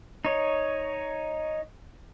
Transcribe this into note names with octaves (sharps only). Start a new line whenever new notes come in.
D#4 C#5